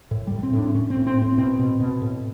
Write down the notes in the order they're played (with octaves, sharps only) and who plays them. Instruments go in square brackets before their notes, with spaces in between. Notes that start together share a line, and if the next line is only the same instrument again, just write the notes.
[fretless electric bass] A2
A2 G3
C4
A2
D4
A2 C#4
C4
A2
C4
A2
C4
B2 C4
B2
B2
A2